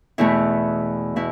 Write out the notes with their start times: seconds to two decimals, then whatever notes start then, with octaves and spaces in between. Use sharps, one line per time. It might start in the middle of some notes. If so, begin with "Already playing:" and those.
0.18 E2 B2 A3 E4
1.16 B2 E4